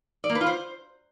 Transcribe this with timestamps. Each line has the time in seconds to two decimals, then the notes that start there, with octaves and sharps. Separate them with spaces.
0.24 D5
0.29 A#3
0.35 B4
0.41 F4
0.46 C5